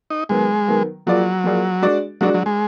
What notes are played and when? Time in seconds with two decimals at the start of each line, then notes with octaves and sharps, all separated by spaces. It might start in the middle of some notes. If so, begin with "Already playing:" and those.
0.10 D#4
0.29 D#3 F#3 G#3 B3
0.68 D#3 F#3 B3
1.06 F3 F#3 A#3 F4 G#4 D5
1.44 F3 A#3 F4 G#4 D5
1.82 G#3 D4 F#4 D5
2.21 F#3 G#3 D4 F#4 D5
2.34 F#3
2.46 G#3